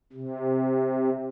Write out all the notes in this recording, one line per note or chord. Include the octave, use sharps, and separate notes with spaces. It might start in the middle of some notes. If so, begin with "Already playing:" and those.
C3